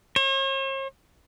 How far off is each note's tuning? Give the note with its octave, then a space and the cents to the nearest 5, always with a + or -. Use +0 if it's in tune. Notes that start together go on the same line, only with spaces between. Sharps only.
C#5 -45